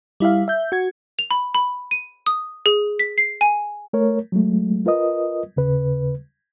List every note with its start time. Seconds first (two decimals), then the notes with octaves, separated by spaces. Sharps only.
0.20 G3 E4 E5 F5
0.48 E5 G6
0.72 F#4 G#6
1.19 F7
1.31 B5
1.55 B5
1.91 D#7
2.26 D#6
2.66 G#4
2.99 B6
3.18 C7
3.41 G#5
3.93 A3 A#4 C#5
4.32 F#3 G#3 A3
4.86 F4 A#4 B4 D#5 D#6
5.56 D#2 C#3 B4